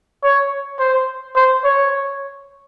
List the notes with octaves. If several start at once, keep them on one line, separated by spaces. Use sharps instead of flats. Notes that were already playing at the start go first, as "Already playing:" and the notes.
C#5
C5
C5
C#5